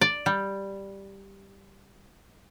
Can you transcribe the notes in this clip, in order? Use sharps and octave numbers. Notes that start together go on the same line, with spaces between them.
D5
G3